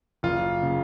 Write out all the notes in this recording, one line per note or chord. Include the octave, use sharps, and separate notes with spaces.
F#1 F4
C#3